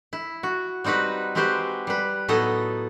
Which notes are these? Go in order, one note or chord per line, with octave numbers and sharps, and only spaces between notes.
E4
F#4
G3 C4 D#4 F#4 B4
G#3 C4 F#4 G4 B4 C5
G3 B4
A2 F#3 B3 D#4 A4 D#5